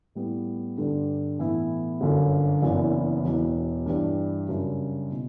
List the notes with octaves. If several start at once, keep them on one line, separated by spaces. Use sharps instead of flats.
A2 G3 B3
G2 D3 G3 D4
A2 E3 B3 E4
G1 F#2 D3
F#1 F#2 E3 B3 D4
E1 E2 B2
G2 E3 G3 D4
F#2 C#3 G3 D4
B2